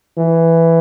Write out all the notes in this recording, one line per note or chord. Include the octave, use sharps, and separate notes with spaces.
E3